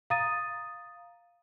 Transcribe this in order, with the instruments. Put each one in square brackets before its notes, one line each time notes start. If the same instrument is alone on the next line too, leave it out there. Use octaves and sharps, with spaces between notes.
[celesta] F5 A#5 D#6 A6 D#7